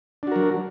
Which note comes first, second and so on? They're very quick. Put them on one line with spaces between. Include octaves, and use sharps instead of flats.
D4 F#4 A#4 F#3